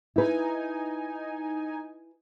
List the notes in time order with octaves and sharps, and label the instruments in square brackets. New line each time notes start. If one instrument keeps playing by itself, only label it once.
[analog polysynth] D#4 G#5 [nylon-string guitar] E4 B4